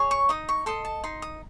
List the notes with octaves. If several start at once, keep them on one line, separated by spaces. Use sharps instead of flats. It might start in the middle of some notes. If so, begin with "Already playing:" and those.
Already playing: G#4 C#5
C#6
D#4 D#6
C#6
A4 D#5 C6
A5
D#4 C6
D#6